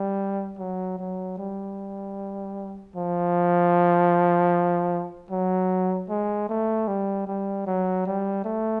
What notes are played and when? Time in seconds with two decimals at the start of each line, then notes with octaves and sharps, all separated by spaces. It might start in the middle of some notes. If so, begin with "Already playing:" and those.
Already playing: G3
0.59 F#3
0.98 F#3
1.38 G3
2.96 F3
5.31 F#3
6.09 G#3
6.49 A3
6.88 G3
7.27 G3
7.66 F#3
8.07 G3
8.45 A3